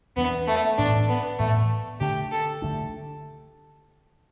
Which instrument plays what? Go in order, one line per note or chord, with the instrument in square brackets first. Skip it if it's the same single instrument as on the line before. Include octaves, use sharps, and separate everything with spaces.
[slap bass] E2 E3 A3 D4 [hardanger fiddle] B3
[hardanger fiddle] A3
[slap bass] A2 E3 B3 [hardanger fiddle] D4
[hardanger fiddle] B3
[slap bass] A2 E3 B3 [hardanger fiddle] A3
[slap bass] D3 A3 D4 [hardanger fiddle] G4
[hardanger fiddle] A4
[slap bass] D3 A3 D4